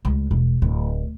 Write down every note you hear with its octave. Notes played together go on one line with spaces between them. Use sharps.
C#2
E1
D1